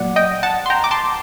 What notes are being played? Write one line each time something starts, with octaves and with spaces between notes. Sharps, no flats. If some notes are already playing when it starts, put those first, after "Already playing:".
Already playing: A#2 F#3 A#3 D5 F#5
D#5 G5
F#5 A5
C6
G5 A#5
D6
A5 C6